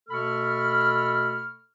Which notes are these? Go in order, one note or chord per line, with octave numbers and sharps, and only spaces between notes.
B2 A3 A4 B5 C#6 F6